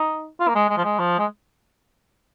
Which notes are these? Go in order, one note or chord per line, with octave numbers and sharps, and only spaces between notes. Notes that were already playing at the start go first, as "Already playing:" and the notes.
Already playing: D#4
F4
A#3
G#3
G#3
F3
G#3
F3
G#3